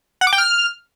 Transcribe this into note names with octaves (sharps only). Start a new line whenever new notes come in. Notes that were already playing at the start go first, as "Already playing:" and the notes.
F#5
D6
G5
F6